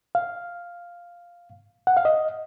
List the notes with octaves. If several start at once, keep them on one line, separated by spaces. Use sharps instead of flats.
F5
F#5
F5
D#5